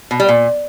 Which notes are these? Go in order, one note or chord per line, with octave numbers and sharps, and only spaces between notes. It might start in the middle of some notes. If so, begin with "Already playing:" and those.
B2
G3
A#2